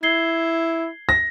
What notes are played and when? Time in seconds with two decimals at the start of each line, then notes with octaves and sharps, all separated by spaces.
0.03 E4 G#6 C7 G7
1.09 A#6